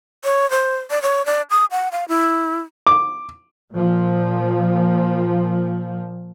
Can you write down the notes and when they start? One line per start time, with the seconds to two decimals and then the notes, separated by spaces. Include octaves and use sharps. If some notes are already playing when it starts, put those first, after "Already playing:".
0.24 C#5
0.51 C5
0.91 D5
1.02 C#5
1.26 D5
1.51 D#6
1.71 F#5
1.92 F5
2.09 E4
2.87 D6
3.73 A#2 F3